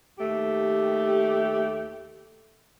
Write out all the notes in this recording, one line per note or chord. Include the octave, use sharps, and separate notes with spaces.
D#2 A3 G4